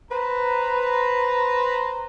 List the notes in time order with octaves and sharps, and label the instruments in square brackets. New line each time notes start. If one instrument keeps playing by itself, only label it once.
[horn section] B4 C5 A#5